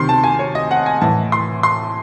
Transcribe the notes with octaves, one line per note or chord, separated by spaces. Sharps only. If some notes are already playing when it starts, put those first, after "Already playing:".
Already playing: C3 D#3 C6
A5
G#5
C#5
D#5
F#5
G#5
A2 E3 A5
C6
C6